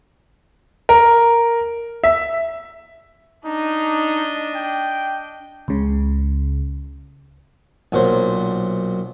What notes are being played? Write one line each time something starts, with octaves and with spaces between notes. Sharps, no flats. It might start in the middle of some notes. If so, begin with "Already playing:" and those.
A#4
E5
D4 D#4 D#5
G5
C#2 C#3
B1 A#2 F#3 C5